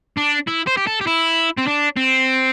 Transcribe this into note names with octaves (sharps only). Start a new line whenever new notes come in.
D4
E4
C5
G4
A4
G4
E4
C4
D4
C4